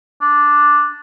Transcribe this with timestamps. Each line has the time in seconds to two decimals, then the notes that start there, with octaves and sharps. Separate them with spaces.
0.21 D4